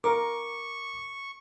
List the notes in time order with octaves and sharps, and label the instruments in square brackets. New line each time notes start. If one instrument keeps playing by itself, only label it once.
[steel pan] A#4 [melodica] C#6 [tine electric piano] D6